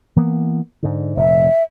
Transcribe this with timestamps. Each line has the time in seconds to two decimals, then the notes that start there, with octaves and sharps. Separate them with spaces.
0.16 E3 A#3 B3
0.83 G#2 D3
1.17 F1 A#2 E5